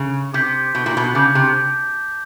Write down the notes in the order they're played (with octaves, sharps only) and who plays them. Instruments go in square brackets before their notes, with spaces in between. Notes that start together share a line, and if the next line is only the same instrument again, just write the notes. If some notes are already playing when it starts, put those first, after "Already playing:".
Already playing: [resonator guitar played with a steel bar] C#3
[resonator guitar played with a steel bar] C3 [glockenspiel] D6 G6 B6
[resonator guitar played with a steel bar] B2
A#2
B2
[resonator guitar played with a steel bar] C#3 [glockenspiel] A5 D6 G6
[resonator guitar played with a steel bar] C3